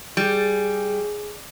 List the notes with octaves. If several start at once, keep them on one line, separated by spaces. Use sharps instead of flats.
G3 G#4